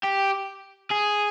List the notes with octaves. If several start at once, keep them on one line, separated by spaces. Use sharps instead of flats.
G4
G#4